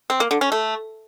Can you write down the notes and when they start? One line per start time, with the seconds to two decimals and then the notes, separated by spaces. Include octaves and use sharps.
0.10 C4
0.20 A#3
0.31 D3
0.41 C#4
0.52 A3